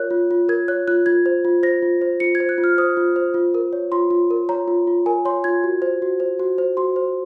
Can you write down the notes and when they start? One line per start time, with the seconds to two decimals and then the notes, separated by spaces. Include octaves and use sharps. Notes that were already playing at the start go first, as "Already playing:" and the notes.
Already playing: F4 A#4 C#5 F#6
0.11 F4
0.31 F4
0.49 A#4 G#6
0.68 C#5 F#6
0.88 F4 F#6
1.06 F4 G#6
1.26 C5
1.45 F4
1.63 C5 A#6
1.82 F4
2.01 C5
2.20 F4 C#7
2.35 G#6
2.40 C5
2.49 F#6
2.58 F4
2.64 F6
2.78 C5 D#6
2.97 F4
3.16 C5
3.34 F4
3.54 A#4
3.73 C#5
3.92 F4 C6
4.11 F4
4.31 A#4
4.49 C#5 A#5
4.68 F4
4.87 F4
5.06 A#4 G#5
5.25 C#5 C6
5.44 F4 G#6
5.64 F#4
5.82 C5
6.02 F#4
6.20 C5
6.40 F#4
6.58 C5
6.77 F#4 C6
6.96 C5